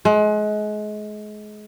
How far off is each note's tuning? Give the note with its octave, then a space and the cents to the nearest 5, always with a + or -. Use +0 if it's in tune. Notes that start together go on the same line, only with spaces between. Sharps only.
G#3 +30